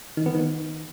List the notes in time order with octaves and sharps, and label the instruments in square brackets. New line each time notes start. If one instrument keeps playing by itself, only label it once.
[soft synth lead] D#3
B3
D#3